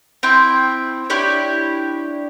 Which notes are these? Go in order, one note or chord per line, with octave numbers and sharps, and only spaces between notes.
C4 E4 G5
D4 E4 G4 C#5